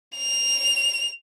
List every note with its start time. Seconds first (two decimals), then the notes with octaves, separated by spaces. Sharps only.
0.17 F7